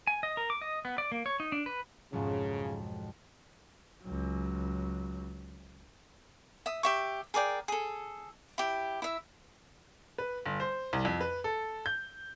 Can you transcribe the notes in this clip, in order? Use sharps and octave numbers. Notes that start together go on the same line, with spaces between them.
G#5
D#5
A#4
D6
D#5
B3
D5
A#3
C#5
D#4
D4
B4
B1 F2 G#2 C#3
C#2 F#3
E5 D#6
G4 E5 C#6
G#4 A#4 D5 G5
G#4 A4
E4 G4
E4 E5
B4
G1
C5
C2
F2
B4
A4
G6